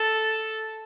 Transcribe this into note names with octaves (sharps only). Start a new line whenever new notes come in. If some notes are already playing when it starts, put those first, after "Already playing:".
Already playing: A4